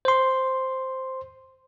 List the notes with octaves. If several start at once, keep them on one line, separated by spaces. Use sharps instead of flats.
C5 C6